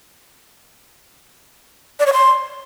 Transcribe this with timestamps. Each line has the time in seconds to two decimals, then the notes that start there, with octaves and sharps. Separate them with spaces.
1.99 D5
2.06 C#5
2.13 C6